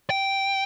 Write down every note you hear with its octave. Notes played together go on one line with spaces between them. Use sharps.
G5